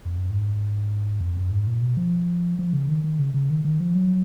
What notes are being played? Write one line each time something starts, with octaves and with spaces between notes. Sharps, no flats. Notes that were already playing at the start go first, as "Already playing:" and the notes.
F2
F#2
G#2
F2
F#2
G#2
A#2
B2
F3
F3
C#3
D#3
D#3
C#3
C#3
D#3
D#3
F3
F#3